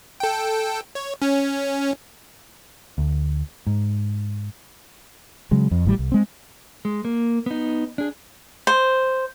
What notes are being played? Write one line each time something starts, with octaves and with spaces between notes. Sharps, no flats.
A4 G5
C#5
C#4
D2
G#2
C#3 F#3 G#3
F2
G#1 A2 D3 G3
C2
G#3 C4
G#3
A#3
B3 D#4
D4 G#4
C5